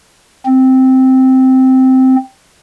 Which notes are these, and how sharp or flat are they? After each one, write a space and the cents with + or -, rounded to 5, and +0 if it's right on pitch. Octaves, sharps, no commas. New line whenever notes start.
C4 -5